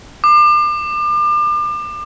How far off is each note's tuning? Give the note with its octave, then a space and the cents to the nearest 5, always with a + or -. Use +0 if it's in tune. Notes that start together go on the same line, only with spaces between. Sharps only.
D6 +35